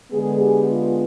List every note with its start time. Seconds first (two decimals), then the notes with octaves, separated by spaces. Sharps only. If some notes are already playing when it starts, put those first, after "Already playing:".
0.11 D3 G#3 B3 G#4
0.40 G4
0.70 F4